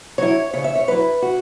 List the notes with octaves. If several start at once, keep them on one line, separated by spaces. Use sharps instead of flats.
F#3 E4 C#5
C#3 C#5
E5
C#5
F#3 E4 B4
F#4